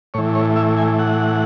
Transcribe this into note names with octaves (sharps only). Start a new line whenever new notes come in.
A2 E3 C#5
C#5
E5
G#5
F#5